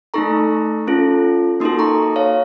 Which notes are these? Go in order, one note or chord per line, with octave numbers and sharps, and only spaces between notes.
A3 D#4 A4 A#5 C#6
C#4 F4 A4
A#3 D#4 F#4 A4 C6 D#6
A#5 C#6
C#5 F5